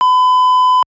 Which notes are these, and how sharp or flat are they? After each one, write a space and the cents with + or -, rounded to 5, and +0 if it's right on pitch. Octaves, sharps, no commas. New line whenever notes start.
B5 +35